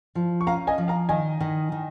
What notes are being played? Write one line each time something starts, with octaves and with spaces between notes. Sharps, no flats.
F3
C#6
C#4 F5 A#5
D#5 G#5
F3
F5 A#5
D#3 D#5 G#5
D#3
D#3